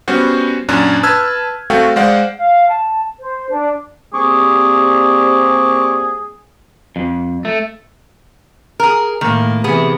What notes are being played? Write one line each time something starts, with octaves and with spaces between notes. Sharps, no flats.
G3 B3 C#4 F#4 C5
F#2 A#2 C#4 D4 F#6
B4 A5 E6 F6 G#6
A3 C4 F#4 A4 F5 G5
G#3 C5 D5 F5 F#5
F5
A5
C5
D4
G3 A#3 C4 G#4 C#6 D6
F2
A3
G#4 A#4
A2 D#3 A#3
C3 E3 B3 G#4